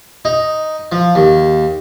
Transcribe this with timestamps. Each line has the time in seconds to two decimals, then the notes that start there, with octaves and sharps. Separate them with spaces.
0.25 D#4
0.92 F3
1.15 D#2